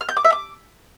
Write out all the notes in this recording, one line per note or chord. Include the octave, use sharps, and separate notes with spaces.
F6
G6
D6
E5
D6